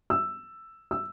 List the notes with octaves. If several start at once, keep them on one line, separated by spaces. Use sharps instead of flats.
E6
E6